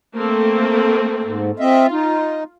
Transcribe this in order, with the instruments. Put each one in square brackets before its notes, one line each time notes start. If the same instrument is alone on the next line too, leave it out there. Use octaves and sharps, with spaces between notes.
[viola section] A3 A#3 C4
[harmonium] G#2
[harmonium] C4 D#5 E5 [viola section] F4
[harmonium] D#4